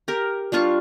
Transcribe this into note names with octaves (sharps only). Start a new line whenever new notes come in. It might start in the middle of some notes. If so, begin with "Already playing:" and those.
G4 A#4
G3 D4 F4 C#6